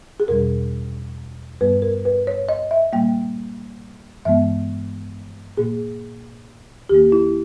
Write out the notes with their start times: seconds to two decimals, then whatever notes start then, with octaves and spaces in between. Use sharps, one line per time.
0.20 G#4
0.28 E2 B2 G3 A#4
1.61 G2 G3 B3 B4
1.82 A#4
2.05 B4
2.27 C#5
2.49 D#5
2.71 E5
2.93 A#2 G3 A#3 G5
4.25 G2 E3 G#3 B3 E5
5.57 A#2 A#3 G#4
6.89 D#2 D#3 A#3 G4
7.12 E4